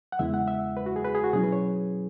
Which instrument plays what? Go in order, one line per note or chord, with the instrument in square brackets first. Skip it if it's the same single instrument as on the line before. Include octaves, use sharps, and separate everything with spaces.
[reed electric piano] F#5
E2 C#3 G#3 B3 E4 E5
F#5
E5
B4
F#4
G#4
B4
G#4
F#4
B2 F#3 C#4 E4 G#4
B4
C#5